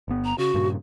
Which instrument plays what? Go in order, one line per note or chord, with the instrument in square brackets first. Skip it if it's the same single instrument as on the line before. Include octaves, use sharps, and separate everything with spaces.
[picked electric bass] G1 B3
[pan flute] A#5
[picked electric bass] C#3 [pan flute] F#4
[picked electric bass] G2 A#2 C#3